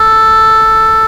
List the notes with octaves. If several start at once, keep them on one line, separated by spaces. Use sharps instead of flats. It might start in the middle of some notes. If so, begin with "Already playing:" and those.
Already playing: A4